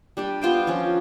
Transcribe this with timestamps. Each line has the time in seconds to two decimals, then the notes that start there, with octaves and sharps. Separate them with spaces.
0.17 G3 D4 G4
0.42 B3 F4 C5 G5
0.67 F3 C#4